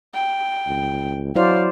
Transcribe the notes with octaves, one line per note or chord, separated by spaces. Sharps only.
G5
C#2
F#3 E4 C5 D5 F5